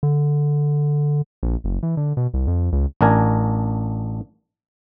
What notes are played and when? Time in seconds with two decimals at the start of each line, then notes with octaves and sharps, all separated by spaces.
0.03 D3
1.43 A#1
1.64 F#1
1.83 E3
1.97 D3
2.17 B2
2.34 C2
2.47 F2
2.72 C#2
3.01 A1 D4 A#4 G#5